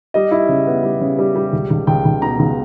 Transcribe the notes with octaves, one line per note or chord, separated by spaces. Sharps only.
G3 D#5
E4
C#3
B3
G3
C#3
G3
G3
C#2
C#2
C#2 G5
C#2
B2 A#5
C#2